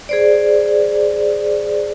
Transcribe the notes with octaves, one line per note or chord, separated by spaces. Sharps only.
G#4 C5 D5